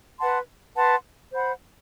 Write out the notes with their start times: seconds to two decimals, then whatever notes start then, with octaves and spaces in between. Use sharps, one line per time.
0.19 B4 F#5 A5 C6
0.75 B4 F#5 A5 C6
1.32 C5 F#5 B5